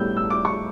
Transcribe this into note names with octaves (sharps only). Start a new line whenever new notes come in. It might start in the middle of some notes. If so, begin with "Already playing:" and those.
Already playing: A2 G3 B3 E6 G6
E6
D6
C#6